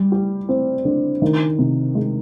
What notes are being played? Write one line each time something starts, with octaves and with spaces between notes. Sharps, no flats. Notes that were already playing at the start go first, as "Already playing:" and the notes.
Already playing: G3
G4
C4
D3
D#3
C3
G#3